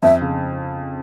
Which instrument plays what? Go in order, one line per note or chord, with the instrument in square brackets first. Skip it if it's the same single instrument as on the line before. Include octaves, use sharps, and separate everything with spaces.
[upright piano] F2 [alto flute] E5
[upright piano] C#3